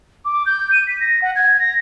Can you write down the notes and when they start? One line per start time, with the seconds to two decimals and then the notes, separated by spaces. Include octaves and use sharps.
0.25 D6
0.46 G6
0.72 D#7
0.87 B6
1.00 A#6
1.22 F#5
1.35 G#6
1.59 A#6